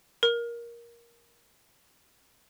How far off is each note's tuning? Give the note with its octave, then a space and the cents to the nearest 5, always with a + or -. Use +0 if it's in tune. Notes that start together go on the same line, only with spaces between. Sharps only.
A#4 +15